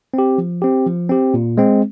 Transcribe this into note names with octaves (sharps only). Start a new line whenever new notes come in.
C4 G4
F3
C4 G4
F3
C4 G4
A#2
G#3 C4